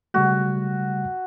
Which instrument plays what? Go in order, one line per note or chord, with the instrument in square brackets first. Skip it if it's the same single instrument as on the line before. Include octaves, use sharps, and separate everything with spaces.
[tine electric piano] C#3 G3 A3 [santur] F#4